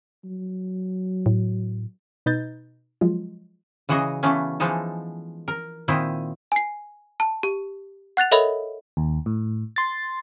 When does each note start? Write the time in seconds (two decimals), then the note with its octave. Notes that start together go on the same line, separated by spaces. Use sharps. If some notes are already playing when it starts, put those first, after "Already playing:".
0.25 F#3
1.26 A2
2.26 B2 D#4 B4 D#5 G6 A6
3.01 F3 F#3 G#3 F4
3.89 C#3 E3 F#4 G#4 D#5
4.23 C#3 E3 A3 B3 C#4
4.60 E3 F3 G#3 D#4 A4
5.48 A#4
5.88 A#2 D#3 C4 E4 D#5
6.52 G#5 C7
7.20 A5
7.43 G4
8.17 F#5 F#6 A6 F7
8.31 A4 A#4 C#5 D#5 E5 B5
8.97 D#2
9.26 A2
9.76 C6 A6